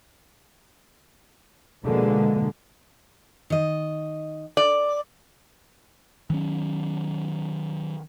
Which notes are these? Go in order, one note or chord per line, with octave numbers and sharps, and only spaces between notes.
B2 D3 F3 G#3 A#3
D#3 D#5
D5
D#3 F#3 C#4